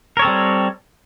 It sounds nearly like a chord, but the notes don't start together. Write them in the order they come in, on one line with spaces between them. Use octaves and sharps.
A#4 C#5 A4 C4 G3